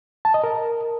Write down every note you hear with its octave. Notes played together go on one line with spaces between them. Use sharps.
A5
D#5
A#4